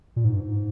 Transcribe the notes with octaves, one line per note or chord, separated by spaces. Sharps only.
A#2
G#2
G2
G#2